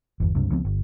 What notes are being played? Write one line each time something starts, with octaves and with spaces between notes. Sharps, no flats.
G1 E2
C#2 G2 C3
C#2 F3 B3 C4
G1